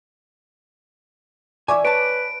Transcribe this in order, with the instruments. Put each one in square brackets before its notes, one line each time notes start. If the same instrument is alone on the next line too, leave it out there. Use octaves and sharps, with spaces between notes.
[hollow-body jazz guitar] E3 E5 G#5 [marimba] D5 C#6 D6
[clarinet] B4 [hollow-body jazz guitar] C#5 A5 [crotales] D7